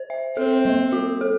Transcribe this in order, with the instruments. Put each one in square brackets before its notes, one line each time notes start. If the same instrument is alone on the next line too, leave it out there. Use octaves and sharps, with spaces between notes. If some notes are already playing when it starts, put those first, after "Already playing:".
Already playing: [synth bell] C5
E5
[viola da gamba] C4 [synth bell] A4
[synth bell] G3
F#4
A4